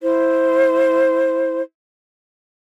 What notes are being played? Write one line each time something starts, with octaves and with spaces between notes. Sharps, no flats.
E4 C5